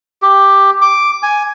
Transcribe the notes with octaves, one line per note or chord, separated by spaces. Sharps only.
G4
D6
G#5